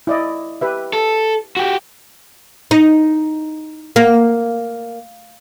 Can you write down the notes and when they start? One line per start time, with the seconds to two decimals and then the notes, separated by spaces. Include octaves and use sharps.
0.07 E4 D5 D#5
0.61 G4 B4 E5
0.93 A4
1.57 F#4 G4
2.71 D#4
3.96 A#3